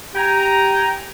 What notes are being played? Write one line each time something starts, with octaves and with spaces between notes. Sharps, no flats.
G4 G5 G#5 A#5